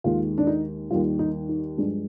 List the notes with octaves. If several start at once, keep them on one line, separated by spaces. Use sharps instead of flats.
D#2 D#3 G#3 F4
D4
D#4
D#2 D#3 G3 F4
D#4
D#4
G2 F3 G#3 D4